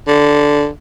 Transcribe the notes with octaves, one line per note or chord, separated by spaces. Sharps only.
D3